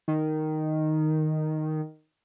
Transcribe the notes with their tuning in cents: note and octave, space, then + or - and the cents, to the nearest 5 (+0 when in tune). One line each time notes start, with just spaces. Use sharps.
D#3 -5